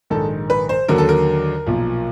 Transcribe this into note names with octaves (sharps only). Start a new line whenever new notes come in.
A#1 G#2 D#3 A4
B4
C5
D#2 D3 F#3 A#4
A4
A#4
B1 A#2 F3